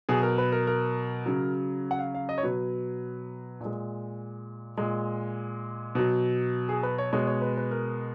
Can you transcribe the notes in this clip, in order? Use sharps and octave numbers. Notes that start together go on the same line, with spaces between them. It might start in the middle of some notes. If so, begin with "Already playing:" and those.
B2 F#3 G#4
A#4
B4
A#4
A#4
C#3 F#3
F#5
F5
F5
D#5
C#5
B2 F#3 B4
A#2 G#3
A#2 G#3
B2 F#3
G#4
B4
C#5
B2 G#3 C#5
C#5
B4
B4
A#4